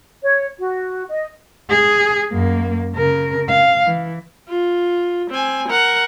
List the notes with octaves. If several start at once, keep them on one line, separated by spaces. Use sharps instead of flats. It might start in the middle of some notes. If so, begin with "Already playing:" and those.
C#5
F#4
D#5
G#4
F#2 A#3
C#3 A#4
F5
E3
F4
C4 G#5
A#4 F#5